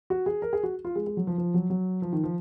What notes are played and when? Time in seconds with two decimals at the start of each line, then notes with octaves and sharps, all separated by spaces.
0.10 F#4
0.26 G#4
0.42 A#4
0.53 G#4
0.63 F#4
0.85 F4
0.96 G#3
1.07 G#3
1.17 F#3
1.27 F3
1.38 F3
1.54 F#3
1.70 F#3
2.02 F3
2.13 D#3
2.24 F3